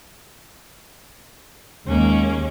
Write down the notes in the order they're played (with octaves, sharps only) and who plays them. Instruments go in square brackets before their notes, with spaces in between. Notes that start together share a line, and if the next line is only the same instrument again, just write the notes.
[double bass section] D#2 G#3 [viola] A#3 C#4